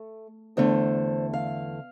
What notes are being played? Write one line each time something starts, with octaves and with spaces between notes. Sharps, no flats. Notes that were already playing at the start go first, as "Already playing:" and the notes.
Already playing: A3
E2 D3 A3 C5
F5